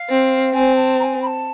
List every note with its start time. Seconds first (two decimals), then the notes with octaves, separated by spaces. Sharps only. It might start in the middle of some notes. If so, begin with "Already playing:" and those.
Already playing: F5
0.09 C4
0.54 C4 G#5
0.76 A5
1.00 A#5
1.03 G#5
1.22 B5
1.27 A5